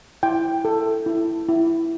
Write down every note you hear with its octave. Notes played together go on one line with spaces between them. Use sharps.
E4 G5
A4
E4
E4